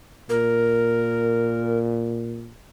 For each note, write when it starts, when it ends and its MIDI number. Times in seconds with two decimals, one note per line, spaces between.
0.29 2.51 46
0.29 1.79 70